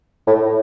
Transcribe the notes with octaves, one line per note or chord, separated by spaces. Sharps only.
A2